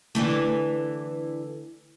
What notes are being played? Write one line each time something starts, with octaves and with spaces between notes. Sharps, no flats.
D3 E3 A3